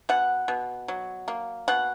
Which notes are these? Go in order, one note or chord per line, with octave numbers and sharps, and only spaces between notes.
B2 F#5
B2
F#3
A#3
B2 F#5